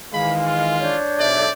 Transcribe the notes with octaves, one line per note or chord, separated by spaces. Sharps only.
D#3 E3 G#3 F5 B5
F4
D4 C#5 G6
B1 G#2 A4 D5 E5